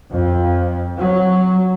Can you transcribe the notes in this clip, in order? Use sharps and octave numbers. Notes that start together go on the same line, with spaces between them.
F2
F#3